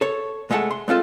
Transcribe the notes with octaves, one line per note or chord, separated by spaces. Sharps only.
A4 C#5
C2 G#3 A3 E5 F#5 A5
C6
G#3 C4 F4 A4